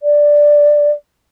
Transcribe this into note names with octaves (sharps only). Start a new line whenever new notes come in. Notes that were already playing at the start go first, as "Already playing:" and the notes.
D5